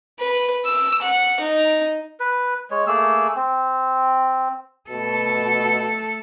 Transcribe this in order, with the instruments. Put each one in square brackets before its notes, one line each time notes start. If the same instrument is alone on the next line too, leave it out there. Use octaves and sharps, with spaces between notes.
[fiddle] B4
E6
F#5
D#4
[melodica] B4
G#3 C#5
A3 A#3 G#4 E6
C4
[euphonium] B2 [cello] A3 A4